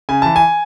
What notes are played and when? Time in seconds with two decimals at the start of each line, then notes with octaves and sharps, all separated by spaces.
0.09 C#3 G#5
0.22 E3 A5
0.36 G#5